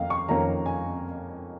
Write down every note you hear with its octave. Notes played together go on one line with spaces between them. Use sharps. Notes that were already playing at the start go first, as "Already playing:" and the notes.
Already playing: F2 D#3 A#3 C#4 D#5 F5 G5
C#6
F2 D#3 A#3 C#4 A#5
G#5